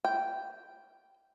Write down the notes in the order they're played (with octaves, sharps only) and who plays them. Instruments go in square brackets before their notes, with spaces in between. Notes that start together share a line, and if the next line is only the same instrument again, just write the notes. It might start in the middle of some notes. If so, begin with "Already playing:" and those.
[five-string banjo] G5